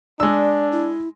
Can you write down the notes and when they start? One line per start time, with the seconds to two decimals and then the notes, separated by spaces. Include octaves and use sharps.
0.20 G#3 D4 D5 E6
0.72 E4